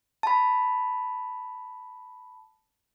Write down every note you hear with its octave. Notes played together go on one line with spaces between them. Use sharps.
A5 B5